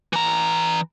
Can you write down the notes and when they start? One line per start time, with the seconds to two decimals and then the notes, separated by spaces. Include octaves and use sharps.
0.13 E3 A#5